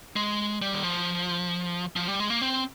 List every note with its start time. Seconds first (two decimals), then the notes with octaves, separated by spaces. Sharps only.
0.16 G#3
0.62 G3
0.73 D#3
0.83 F3
1.96 F3
2.08 G3
2.20 G#3
2.30 A#3
2.42 C4